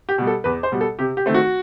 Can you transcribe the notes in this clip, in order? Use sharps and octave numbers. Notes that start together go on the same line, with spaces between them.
G4
B2 G3
A4
E2 B4
C5
B2 G3
A4
C3 G4
G4
D#3 A3 C4
F#4